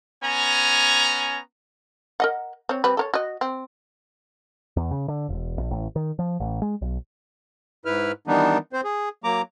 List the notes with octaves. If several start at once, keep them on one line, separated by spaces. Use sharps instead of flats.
B3 C#4 G#5 A#5
A#4 D#5 F#5
C4 C#5
G3 C4 B4
A4 A#4 C#5
F#4 D#5
C4
E2
C#3
D3
E1
A#1
A1
D#3
F3
A1
G#3
B1
G#2 E4 B4 F6
D#3 E3 G3 B3 D4 D#4
C4 C5
G#4
F#3 A#3 A#5 D6